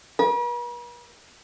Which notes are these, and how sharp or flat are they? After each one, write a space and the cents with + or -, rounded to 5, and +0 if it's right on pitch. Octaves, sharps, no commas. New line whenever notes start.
B4 -45